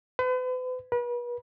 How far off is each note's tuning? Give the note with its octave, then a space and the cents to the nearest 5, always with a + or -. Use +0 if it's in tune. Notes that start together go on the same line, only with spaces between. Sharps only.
B4 +40
B4 -40